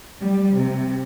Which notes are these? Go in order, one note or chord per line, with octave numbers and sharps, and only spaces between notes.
G3
C3